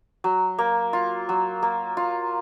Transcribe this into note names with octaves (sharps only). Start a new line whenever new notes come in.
F#3
A#3
F4
F#3
A#3
F4